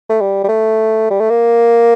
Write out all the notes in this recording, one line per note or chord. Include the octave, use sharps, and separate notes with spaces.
A3
G3
G3
A3
G3
A3
A#3